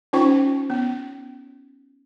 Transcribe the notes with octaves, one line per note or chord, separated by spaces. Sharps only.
C#4 D#4 F4 C5 G5 C#6
B3